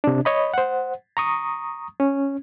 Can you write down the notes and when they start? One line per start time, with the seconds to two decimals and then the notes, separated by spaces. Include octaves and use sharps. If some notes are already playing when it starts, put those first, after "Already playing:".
0.04 C3 D4
0.25 C#5 D#5 B5
0.54 C5 F#5
1.17 A#5 C#6 D#6
2.00 C#4